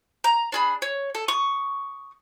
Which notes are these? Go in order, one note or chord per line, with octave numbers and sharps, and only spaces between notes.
A#5
D4 G#4 B5
C#5
A4
C#6 D#6